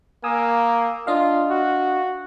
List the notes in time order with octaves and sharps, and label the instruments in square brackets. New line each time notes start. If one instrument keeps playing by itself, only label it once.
[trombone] A#3 [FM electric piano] G#5 D#6 E6
[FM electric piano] D4 D#5 F5 [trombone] F4
[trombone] F#4